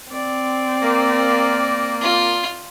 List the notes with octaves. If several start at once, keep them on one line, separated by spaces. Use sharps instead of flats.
C4 D5
A#3
F4